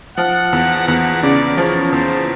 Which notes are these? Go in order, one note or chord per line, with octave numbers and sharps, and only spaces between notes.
F3 F#5
E2
E2 F#5
C#3 D5
F3 C#5
E2 C5